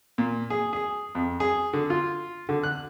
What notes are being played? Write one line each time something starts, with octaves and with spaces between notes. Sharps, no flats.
A#2
G#4
G#4
F2
G#4
D3
F4
D3
F#6